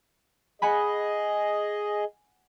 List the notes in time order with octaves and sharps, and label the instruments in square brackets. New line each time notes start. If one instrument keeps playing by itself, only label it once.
[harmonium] G#4 D#5 [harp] F#5 G#5 B5